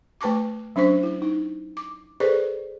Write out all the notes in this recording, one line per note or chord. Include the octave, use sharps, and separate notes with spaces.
A3 B4 A5 C#6 D6
F#3 C#4 D4 C5 C#6
E4
D#4
D6
G#4 A4 B4 C5 D5 C#6